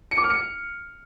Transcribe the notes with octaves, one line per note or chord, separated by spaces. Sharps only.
C#7
D6
F6
C#7